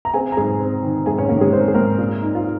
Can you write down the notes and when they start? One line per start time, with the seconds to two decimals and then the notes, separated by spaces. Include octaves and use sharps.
0.05 A#5
0.14 C4 G#4 G#5
0.32 A#5
0.37 G#2 G#4 G#5
0.60 C4
0.83 D#3
1.06 G#2 G#4 G#5
1.18 C#4 C#5
1.29 D#3 A#3 A#4
1.41 G#3 G#4
1.52 C4 C5
1.60 A#4
1.68 G#4
1.74 G#2 A#3 A#4
1.98 A#2
2.22 D#4
2.35 F4